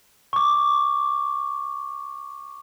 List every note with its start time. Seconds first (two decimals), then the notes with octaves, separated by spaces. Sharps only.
0.33 C#6 D6